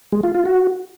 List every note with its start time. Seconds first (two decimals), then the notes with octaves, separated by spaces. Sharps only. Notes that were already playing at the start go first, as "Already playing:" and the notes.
0.12 G#3
0.23 F4
0.34 F4
0.45 F#4